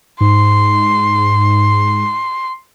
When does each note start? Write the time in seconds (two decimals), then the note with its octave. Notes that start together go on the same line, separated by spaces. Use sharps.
0.21 G#2 C6